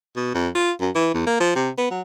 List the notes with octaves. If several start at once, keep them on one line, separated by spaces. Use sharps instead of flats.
B2
F2
F4
F#2
E3
E2
A#3
F3
C3
B3
F#3